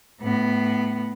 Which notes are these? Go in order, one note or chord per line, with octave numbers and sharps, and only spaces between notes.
A2 B3